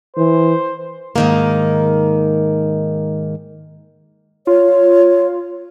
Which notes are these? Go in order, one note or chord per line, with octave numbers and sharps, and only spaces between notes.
E3 C5
G#2 D#3 A#3
F4 C#5